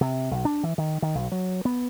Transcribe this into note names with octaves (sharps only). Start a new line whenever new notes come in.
C3
B1
D4
E3
D#3
D#3
B1
F#3
B3